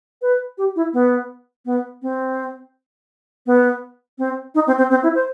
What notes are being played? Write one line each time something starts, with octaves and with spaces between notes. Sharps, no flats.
B4
G4
E4
B3
B3
C4
B3
C4
D#4
C4
C4
C4
E4
C5